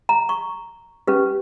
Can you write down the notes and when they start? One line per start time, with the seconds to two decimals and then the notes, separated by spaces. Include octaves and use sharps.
0.09 A#5
0.29 C#6
1.07 C#4 G4 B4